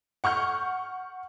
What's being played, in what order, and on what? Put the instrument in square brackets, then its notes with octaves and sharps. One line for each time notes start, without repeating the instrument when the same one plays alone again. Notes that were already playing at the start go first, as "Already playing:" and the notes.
[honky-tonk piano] F#5 C#6 F6 G6